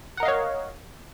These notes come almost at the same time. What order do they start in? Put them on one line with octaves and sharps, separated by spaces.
F#5 A#4 D#5 F5 C#5